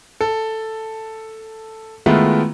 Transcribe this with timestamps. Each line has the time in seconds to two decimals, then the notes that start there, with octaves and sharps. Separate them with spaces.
0.21 A4
2.06 D#3 G#3 A3 B3 E4 F4